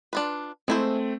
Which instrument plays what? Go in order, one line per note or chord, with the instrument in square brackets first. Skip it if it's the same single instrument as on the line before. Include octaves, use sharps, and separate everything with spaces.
[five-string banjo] D4 F4 B4
[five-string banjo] G#3 E4 C5 [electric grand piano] A3 C4